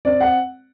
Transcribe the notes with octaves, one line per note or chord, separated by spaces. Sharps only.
C4 D5
F#5